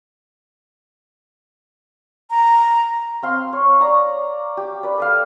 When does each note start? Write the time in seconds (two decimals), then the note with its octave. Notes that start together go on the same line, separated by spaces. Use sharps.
2.30 A#5
3.23 C4 F5 C6
3.53 C#5
3.80 D5 A#5 C#6
4.57 G4
4.83 B4 D5
4.98 A4 B4 F5